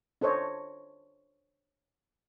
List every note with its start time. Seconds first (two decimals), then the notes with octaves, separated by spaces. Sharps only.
0.21 D4 A4 C5 C#5 D#5